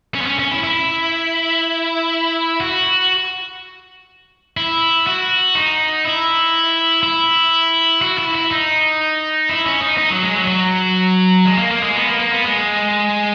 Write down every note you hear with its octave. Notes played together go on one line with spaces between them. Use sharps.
C#4
B3
C#4
C#4
E4
E4
F#4
E4
F#4
D#4
E4
E4
F#4
E4
E4
D#4
E4
C#4
D#4
D#4
F#3
G#3
F#3
F#3
G#3
A#3
A#3
G#3
B3
A#3
A#3
B3
G#3